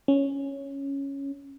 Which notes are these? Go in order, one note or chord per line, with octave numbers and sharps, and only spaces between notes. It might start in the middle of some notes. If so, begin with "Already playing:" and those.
C#4